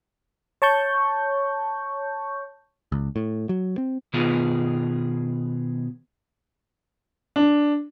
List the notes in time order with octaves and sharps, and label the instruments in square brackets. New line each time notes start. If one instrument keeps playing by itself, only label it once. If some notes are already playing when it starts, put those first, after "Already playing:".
[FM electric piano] C#5 A5 C#6 G6
[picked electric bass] C#2
A2
F#3
C4
[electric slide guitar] B2 D#3 B3 F4 G#4
[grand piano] D4